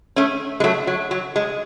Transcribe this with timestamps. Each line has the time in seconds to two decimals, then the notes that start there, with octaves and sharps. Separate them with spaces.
0.16 A3 C#4
0.60 G#3
0.64 F#3 A3
0.87 F#3
1.11 F#3
1.36 G#3